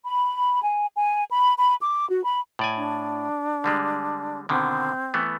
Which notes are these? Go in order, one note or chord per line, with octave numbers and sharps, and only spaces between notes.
B5
G#5
G#5
B5
B5
D6
F#4
B5
A2 D5 G#5
D4
D3 G3 G#3
B2 D3 D#3 C4
E3 A3 B3